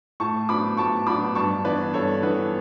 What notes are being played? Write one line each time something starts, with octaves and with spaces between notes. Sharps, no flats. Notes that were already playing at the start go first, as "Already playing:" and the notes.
A2 A5 C#6
F#3 B3 D4 B5 D6
A2 A5 C#6
F#3 B3 D4 B5 D6
G2 A5 C#6
E3 B3 D4 B4 D5
G2 A4 C#5
E3 B3 D4 B4